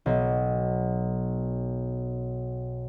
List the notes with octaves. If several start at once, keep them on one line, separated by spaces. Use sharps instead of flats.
B1 F#3